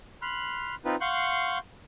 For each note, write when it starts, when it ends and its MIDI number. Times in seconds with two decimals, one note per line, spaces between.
0.22 0.75 83
0.22 0.75 84
0.22 0.75 89
0.22 0.75 90
0.85 0.96 60
0.85 0.96 63
0.85 0.96 65
0.85 0.96 71
1.01 1.58 77
1.01 1.58 78
1.01 1.58 84
1.01 1.58 85
1.01 1.58 90
1.01 1.58 91